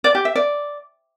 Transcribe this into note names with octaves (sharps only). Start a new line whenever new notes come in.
D5
G4
E5
D5